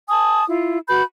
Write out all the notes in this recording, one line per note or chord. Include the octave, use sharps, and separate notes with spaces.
G#5 A5 D#6
E4 F4
F#4 B4 B5 G6